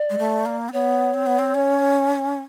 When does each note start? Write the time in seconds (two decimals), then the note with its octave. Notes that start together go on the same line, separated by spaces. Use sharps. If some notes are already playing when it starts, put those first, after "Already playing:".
Already playing: D5
0.10 G#3
0.19 A3
0.46 A#3
0.69 C4
0.73 B3 C#5
1.14 C4
1.27 B3
1.39 C4
1.55 C#4